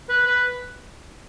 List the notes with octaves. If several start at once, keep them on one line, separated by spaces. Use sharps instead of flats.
B4
B4